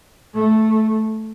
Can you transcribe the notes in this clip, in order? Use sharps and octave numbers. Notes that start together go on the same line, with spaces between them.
A3